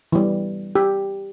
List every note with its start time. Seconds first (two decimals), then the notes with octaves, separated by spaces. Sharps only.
0.12 E3 G3
0.75 G4